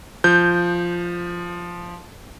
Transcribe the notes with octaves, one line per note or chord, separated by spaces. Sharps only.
F3 G6